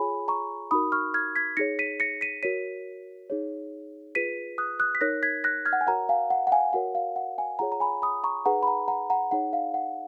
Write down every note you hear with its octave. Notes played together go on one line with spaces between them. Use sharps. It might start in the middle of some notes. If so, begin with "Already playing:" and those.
Already playing: F4 G#4 C#5 G#5 B5
A#5 C#6
D#4 F#4 A#4 B5 D#6
C#6 F6
F6 G#6
G#6 B6
D#4 G#4 C#5 A#6 C#7
B6 D#7
A#6 C#7
B6 D#7
F#4 A#4 C#5 B6 D#7
D#4 G#4 C#5
F4 G#4 B4 B6 D#7
D#6 F#6
D#6 F#6
B6
D#4 A#4 C#5 F#6 A#6
G#6 B6
F#6 A#6
F6 G#6
F#5
G#5
F#4 A#4 C#5 F#5 A#5
F5 G#5
F#5
F#5
F5 G#5
F#4 A#4 C#5 F#5
F5
F#5
F5 G#5
F4 G#4 C#5 F#5 A#5
A#5
G#5 B5
B5 D#6
A#5 C#6
D#4 G#4 B4 F#5 A#5
B5
F#5 A#5
F#5 A#5
F#5 A#5
D#4 G#4 C#5 F#5
F5
F#5